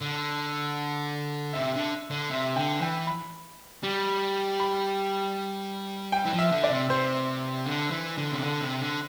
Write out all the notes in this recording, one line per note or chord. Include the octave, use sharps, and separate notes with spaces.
D3
C3 E5
D3
D3
C3 E5
D3 G5
E3 G5
B5
G3
B5
G5
E3
F3
E5
D3
D5
C3
C3 C5
D3
E3
D3
C3
D3
C3
D3